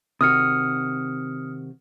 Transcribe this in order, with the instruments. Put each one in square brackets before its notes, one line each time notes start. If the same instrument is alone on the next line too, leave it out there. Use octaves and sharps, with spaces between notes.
[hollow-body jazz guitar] C3 D#3 F#4 [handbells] D#6 F6 C#7